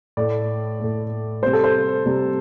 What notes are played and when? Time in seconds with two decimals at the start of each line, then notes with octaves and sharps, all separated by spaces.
0.17 A2 A3 D5
0.80 A2 A3
1.43 C3 G3 C5
1.53 A4
1.64 C5
2.06 C3 G3